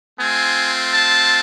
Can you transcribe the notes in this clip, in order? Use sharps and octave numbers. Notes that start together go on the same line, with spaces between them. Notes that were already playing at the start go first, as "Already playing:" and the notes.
A3 C4 F4 G#5
A5